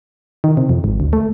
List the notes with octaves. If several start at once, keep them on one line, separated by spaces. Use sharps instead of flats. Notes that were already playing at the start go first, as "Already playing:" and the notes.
D#3
C3
F2
G#1
D2
A3